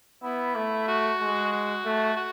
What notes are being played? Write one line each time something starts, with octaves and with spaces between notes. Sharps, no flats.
B3 E4
A3
F#4
G#3
F#4
A3
F#4